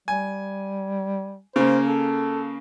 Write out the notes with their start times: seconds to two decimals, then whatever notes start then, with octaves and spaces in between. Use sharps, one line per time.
0.08 G3 G#5
1.56 C#3 A#3 C5
1.86 A4